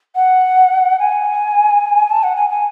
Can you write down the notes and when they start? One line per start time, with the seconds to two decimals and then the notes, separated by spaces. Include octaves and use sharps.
0.15 F#5
0.99 G#5
2.09 A5
2.23 F#5
2.36 G#5
2.50 G#5